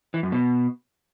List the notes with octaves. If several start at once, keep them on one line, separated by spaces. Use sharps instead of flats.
E3
F#2
B2